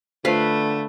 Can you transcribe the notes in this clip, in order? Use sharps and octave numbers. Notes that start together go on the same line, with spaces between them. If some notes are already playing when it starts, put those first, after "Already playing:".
D3 A3 F4 B4 C5 F5